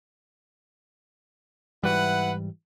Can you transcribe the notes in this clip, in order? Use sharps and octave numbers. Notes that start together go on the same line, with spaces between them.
G#2 E3 G3 E4 B4 F#5